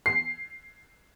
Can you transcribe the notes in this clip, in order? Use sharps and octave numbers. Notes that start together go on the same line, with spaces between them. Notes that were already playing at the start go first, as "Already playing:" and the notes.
C7